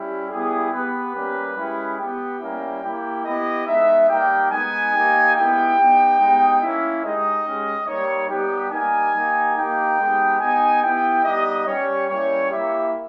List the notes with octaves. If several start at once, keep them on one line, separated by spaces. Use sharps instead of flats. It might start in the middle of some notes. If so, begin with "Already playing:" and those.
Already playing: G3 C#4 E4 G4
G3 B3 E4 G4 G#4
B3 G4 B4
G3 A#3 C#4 G4
G#3 C#4 E4 G4
B3 G4 G5
G3 A#3 C#4 E4
A#3 E4 G4
B3 E4 G4 D#5
G#3 B3 D#4 E5
G3 A#3 D#4 G4 G5
G#3 B3 D#4 G#5
A#3 D#4 G4
G#3 B3 E4 G4 G5
B3 D#4 G4
G#3 B3 D#4 G4
A#3 C#4 E4 E5
G#3 D#4 G4 D#5
G#3 C#4 G4
G3 A#3 D#4 C#5
G3 B3 D#4 G4
G3 A#3 D#4 G#5
A#3 D#4 G4
A#3 D#4 G4 G5
G#3 B3 D#4 G4
B3 D#4 G4 G#5
B3 E4 G4 G5
G3 B3 D#4 G4 D#5
G3 C#4 G4 C#5
G3 A#3 C#4 E4 G4 C#5
A#3 E4 G4 E5